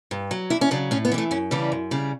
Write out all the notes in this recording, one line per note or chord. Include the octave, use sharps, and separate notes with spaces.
G2
F#3
E2 E4
C#4
C#3 F#3 D4
A2 C#4
B3
E3 G3
A3
F#2 C#4
C#3 E3 G3 D4
F#2
C#3 G3